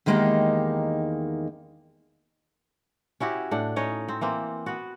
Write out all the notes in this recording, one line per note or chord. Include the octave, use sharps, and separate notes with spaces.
E2 D#3 G#3 A#3 D#4 G4
C#4 E4 F#4 G4
A2 D4 F#5
C#4 D#4 C#5 D#5
C4
E3 A#3 C4
B3 F#4